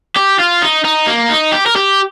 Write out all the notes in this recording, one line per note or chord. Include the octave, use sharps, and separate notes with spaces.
G4
F4
D#4
D#4
A#3
D#4
G4
A#4
G4